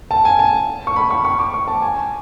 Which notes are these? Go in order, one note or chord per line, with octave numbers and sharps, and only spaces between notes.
A5
G#5
A5
C#6
B5
C#6
C#6
D6
C#6
A5
G#5